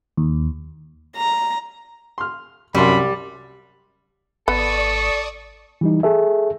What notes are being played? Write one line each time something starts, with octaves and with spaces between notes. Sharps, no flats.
D#2
A#5
C6 F6
C2 F#2 G3 B5 C6
G#1 B3 A4 D5 C#6 D#6
E3 G3 D#4
G#4 A4 E5